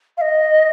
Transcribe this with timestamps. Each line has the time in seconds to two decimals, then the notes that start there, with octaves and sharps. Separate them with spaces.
0.17 F5
0.21 D#5